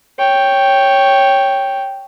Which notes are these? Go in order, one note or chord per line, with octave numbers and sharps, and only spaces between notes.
C#5 G5